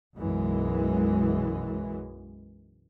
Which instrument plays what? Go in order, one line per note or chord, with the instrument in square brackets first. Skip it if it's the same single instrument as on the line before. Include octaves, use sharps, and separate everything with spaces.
[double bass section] B1 F#2 E3 G#3